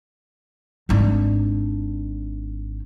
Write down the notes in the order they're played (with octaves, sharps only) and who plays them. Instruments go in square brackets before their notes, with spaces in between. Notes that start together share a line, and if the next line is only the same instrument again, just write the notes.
[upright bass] G#1 D4